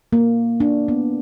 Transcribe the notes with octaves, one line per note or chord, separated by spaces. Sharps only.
A#3
D4
B3